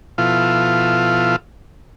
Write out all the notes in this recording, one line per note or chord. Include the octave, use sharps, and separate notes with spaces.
B2 F3 E4 F4 A4 F5